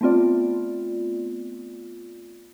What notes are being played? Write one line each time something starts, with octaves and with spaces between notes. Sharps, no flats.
A3 B3 C4 F4 D5